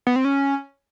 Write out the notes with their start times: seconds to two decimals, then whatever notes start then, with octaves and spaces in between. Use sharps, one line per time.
0.07 B3
0.16 C4
0.25 C#4